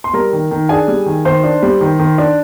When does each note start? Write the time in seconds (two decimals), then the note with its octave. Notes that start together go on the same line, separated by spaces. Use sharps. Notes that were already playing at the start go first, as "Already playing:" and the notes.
0.04 C6
0.13 G3 A#4 A#5
0.33 D#3
0.51 D#3
0.69 D4 G#4 G#5
0.88 G3
1.06 D#3
1.25 D#3 C5 C6
1.44 D4
1.63 G3
1.81 D#3
1.99 D#3
2.18 D4